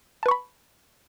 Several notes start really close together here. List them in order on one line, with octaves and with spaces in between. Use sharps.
A5 B4 C#6 B5